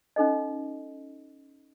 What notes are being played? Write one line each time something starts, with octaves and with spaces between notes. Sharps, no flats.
C#4 D#4 A4 D#5